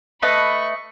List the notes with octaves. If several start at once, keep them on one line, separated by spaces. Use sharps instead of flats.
A3 B4 D#5 B5 C#6